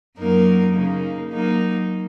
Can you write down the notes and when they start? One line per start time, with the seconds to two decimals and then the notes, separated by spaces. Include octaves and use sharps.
0.18 F#2 F#3 A#3 D#4 A#4
0.74 C#3 A#3 D#4
1.29 F#3 A#3 D#4